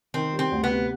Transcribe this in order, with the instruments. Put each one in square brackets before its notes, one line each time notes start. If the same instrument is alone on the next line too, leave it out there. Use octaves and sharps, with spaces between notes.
[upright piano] D#3 [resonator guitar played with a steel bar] C4
[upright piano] G3
[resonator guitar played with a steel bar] C4
[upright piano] D2
[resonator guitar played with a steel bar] B3
[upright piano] C3